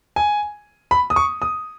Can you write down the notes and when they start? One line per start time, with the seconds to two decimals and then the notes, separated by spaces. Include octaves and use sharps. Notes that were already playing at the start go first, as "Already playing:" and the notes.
0.16 G#5
0.91 B5
1.10 D#6
1.16 C#6
1.42 D#6